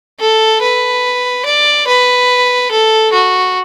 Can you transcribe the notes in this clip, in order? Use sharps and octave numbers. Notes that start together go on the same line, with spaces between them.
A4
B4
D5
B4
A4
F#4